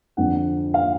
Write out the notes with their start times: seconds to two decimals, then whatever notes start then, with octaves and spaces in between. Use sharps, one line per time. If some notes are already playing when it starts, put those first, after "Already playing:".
0.17 F2 D3 F3 F#5
0.74 F5